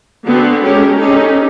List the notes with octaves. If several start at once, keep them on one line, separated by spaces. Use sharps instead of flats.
D3 B3 C4 F#4
G#3 C#4 G4 A4 A#4
C4 C#4 D#4 G4 A4